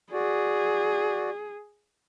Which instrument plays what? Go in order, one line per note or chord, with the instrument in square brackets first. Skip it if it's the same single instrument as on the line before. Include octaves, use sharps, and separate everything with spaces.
[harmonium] F#4 D5 [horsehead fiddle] G#4